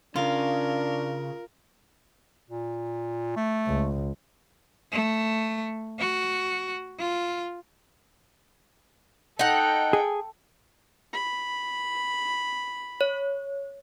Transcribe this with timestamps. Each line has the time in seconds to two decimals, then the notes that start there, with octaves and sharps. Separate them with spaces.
0.16 C#3 D4 F4 A#4
2.50 A#2
3.36 A3
3.67 C#2
4.92 A3
6.00 F#4
7.00 F4
9.39 D#4 A4 F#5 G5
9.93 G#4
11.13 B5
13.01 C#5